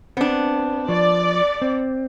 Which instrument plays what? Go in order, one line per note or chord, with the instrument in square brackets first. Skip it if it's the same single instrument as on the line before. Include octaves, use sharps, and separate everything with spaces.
[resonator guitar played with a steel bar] B3 D4 [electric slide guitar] C4
[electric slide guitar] F3 [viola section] D5
[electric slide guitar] C4